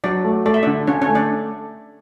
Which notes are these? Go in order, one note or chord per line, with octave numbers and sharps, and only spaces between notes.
F#3 D4 D5
A3
A3 D5
E5
D3 D4 D5
D3 C#4 C#5
C#4 C#5
A3
D4 D5